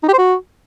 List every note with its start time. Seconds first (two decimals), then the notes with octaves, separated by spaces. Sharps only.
0.03 D#4
0.08 G4
0.13 C5
0.18 F#4